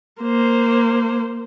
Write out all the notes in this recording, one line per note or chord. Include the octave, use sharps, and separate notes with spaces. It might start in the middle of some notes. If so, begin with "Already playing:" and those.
A#3 C5